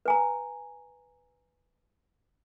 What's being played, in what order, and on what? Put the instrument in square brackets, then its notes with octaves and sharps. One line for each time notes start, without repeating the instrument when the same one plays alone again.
[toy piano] B4 G#5 A#5